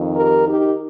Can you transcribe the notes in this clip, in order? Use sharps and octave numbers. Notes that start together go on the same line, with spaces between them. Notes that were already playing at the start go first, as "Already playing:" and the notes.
Already playing: F2 D#3
G4 A#4
D#4 G4